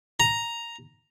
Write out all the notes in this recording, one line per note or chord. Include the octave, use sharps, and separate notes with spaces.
A#5